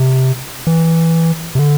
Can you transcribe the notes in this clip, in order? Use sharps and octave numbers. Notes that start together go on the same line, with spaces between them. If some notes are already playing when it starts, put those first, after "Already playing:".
Already playing: C3
E3
C3
D3